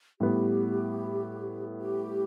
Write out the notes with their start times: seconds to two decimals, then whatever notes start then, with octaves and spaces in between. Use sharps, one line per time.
0.20 A2 G3 B3 G4
1.80 G4